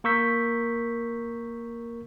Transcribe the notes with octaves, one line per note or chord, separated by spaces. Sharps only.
A#3 A#4 C#6 E6 G6 B6